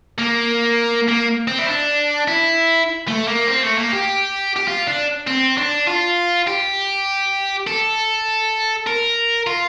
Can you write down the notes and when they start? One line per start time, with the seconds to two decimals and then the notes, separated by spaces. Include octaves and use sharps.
0.18 A#3
1.08 A#3
1.48 C4
1.59 E4
1.68 D4
2.28 E4
3.08 A3
3.28 A#3
3.47 C4
3.62 A3
3.78 A#3
3.93 G4
4.56 G4
4.68 F4
4.87 D4
5.27 C4
5.57 D4
5.87 F4
6.47 G4
7.67 A4
8.87 A#4
9.47 F4